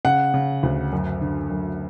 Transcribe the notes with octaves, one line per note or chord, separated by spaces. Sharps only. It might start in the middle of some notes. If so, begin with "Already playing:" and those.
C#3 F#5
C#3
D2
F#2
D3
F#2